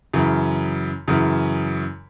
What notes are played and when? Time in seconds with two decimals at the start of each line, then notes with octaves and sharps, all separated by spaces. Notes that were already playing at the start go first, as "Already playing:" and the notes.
0.14 F#2 C#3 E3
1.08 F#2 C#3 E3